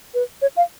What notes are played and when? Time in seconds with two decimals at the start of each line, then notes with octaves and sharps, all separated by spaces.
0.14 B4
0.42 C#5
0.57 F5